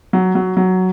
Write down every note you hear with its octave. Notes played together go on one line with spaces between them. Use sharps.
F#3
F#3
F#3